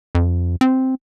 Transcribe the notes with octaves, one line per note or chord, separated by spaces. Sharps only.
F2
C4